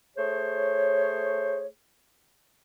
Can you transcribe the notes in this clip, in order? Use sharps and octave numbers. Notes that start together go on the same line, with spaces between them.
A3 G#4 C5 C#5